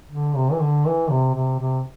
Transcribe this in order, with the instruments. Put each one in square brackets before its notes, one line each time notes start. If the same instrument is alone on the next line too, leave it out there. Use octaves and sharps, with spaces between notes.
[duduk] D3
C3
E3
D3
E3
C3
C3
C3